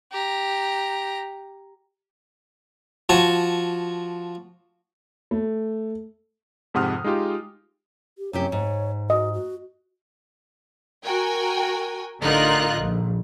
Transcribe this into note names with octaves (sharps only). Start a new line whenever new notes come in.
G4 A#5
F3 F#4 G#5 A5 C#6
A3
F2 G#2 C3 F#5 D#6 F6
G#3 D#4 F4 G4
G4
F#2 C3 G4 C#5
G#2
F#4 D#5
F#4
F#4 A#4 G5 G#5
A1 D3 D#4 F4 A#4 F#6
A#1